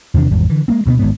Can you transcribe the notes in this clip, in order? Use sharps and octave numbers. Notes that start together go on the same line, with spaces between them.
E2 C3 D#3 D4
G#1 E2 G3
D3 E3
G#3 A#3 C4
D2 B2 A#3 B3
G#1 G#2 B3